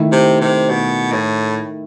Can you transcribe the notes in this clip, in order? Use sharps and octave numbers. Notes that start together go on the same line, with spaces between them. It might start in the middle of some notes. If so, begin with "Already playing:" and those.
Already playing: D#3 A3 E4 A4
C3
C3
B2
A2